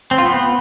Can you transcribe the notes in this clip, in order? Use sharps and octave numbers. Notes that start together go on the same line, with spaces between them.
C4
F4
B3